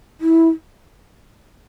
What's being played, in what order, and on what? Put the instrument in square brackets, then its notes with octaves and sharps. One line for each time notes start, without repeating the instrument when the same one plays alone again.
[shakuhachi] E4